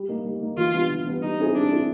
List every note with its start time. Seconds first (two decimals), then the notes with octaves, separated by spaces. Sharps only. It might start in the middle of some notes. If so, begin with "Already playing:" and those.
Already playing: G3
0.09 A#3 D#4
0.25 G3
0.41 A#3 D#4
0.57 E3 F4
0.73 G3 B3 D4
0.90 E3
1.06 G3 B3 D4
1.22 G3 D#4
1.39 C4 E4 G#4
1.54 G3 D4
1.71 C4 E4 G#4